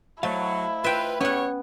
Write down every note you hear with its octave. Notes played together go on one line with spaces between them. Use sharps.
F#3 A3 E4 C5 D#5 F5
F4 B4 E5 G5
E2 G3 B3 C#4 C#5 F#5